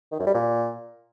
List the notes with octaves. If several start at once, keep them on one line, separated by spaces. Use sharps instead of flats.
D#3
F#2
G3
A#2